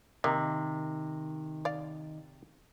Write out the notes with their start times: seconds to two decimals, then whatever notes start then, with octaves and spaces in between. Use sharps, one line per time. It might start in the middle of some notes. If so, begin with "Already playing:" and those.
0.24 C3 D#3 A#3 D#4
1.65 D5 F5